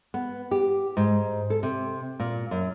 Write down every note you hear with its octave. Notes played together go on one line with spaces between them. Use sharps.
B3
G4
G#2
A4
C3
A#2
F#2